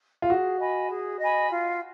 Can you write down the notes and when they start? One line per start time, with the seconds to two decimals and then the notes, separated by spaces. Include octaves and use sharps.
0.22 F4
0.29 F#4 G#4
0.60 D#5 G#5 B5
0.89 G#4
1.20 D#5 G#5 B5
1.50 F4